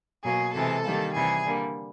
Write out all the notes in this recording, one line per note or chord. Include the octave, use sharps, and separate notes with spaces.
B2 F#3 A#3 G#4
C3 E3 G#3 A4
D#3 G3 A#3
C3 E3 G3 G#4
D3 G3 A#3